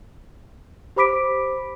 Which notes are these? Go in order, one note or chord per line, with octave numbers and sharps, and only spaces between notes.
G4 C5 B5 D6 B6 D7